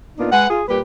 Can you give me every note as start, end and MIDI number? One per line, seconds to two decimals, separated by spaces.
0.18 0.31 46
0.18 0.31 59
0.18 0.31 62
0.18 0.31 63
0.18 0.31 65
0.31 0.47 56
0.31 0.47 71
0.31 0.47 78
0.48 0.62 65
0.48 0.62 68
0.67 0.79 46
0.67 0.79 55
0.67 0.79 67
0.67 0.79 71